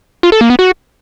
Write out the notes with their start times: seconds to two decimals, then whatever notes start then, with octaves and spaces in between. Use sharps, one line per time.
0.23 F4
0.32 A4
0.41 A#3
0.50 B3
0.59 F#4